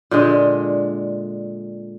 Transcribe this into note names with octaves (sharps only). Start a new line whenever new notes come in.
A#2 D3 G#3